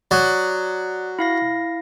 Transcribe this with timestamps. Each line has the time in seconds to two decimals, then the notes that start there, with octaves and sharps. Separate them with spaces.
0.11 F#3 D5 D#6 F#6
1.19 E4 F5 A#6